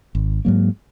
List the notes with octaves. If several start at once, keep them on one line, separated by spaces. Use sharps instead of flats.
G#1
G#2 F#3 A#3